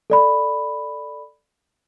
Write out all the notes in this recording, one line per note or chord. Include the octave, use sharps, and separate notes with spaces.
A4 D5 B5